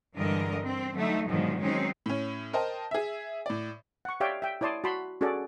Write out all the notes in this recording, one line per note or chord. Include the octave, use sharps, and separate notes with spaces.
G2 D3 E3 G#3 A#4 D#5
C4
D3 F#3 A3 D#4
G#2 B2 D3 D#3 F3 F#3
D#3 F#3 G#3 C4 C#4 D#4
A2 C#4
A#4 C5 D#5 G5 A5
G#4 E5
A2 D5
F#5 C#6
G4 C#5 D5 E5 F5 G5
E5 G5
E4 C#5 D5 A5 C6 D#6
F#4 A5 B5 C6
C#4 F#4 G#4 A4 D5